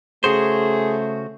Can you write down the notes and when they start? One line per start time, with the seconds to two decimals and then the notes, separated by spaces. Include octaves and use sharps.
0.24 C#3 A3 F#4 G#4 C5